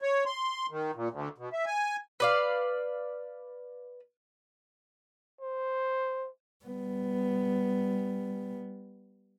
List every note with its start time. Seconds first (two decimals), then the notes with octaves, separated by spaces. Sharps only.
0.02 C#5
0.26 C6
0.71 D#3
0.95 A#2
1.11 D2
1.38 B2
1.53 E5
1.66 G#5
2.20 B4 D5 F5
5.41 C5
6.65 G3 B3